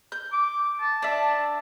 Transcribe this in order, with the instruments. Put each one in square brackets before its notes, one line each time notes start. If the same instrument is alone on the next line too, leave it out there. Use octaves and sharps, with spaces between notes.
[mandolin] G6
[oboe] D6
A5
[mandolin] D4 E5